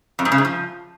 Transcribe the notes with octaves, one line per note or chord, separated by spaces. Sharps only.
F2
G#2
C#3
G#2
F3